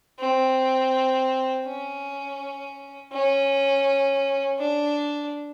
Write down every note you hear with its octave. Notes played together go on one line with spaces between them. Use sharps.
C4
C#4
C#4
D4